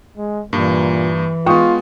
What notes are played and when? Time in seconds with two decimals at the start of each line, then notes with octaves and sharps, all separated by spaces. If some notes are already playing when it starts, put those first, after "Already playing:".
0.17 G#3
0.53 G2 A#2 E3 A#3
1.46 G#3 B3 F4 G5 C#6 D#6